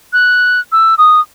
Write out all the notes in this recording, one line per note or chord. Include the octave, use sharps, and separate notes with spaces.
F#6
E6
D#6